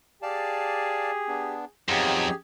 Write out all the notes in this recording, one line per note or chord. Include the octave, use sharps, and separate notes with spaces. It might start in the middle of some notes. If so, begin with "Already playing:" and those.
G4 G#4 D5 F5 A5
B3 D4
F2 F#3 B3 D#4 G4 G#4